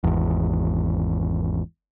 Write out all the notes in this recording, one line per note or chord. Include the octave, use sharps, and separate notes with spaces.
G#1 E2